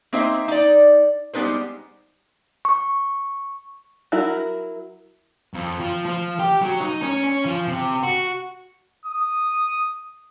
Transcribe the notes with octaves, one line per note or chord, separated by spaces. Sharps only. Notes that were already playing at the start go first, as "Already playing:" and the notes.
A#3 C4 D#4 C5 D#5 E5
D#4 D5
G3 G#3 B3 D#4 B4 C5
C#6
F#3 E4 F#4 A#4
F2
F3
F3
G4
F#3
D#4
C#4
C#4
F3
C3
F#4
D#6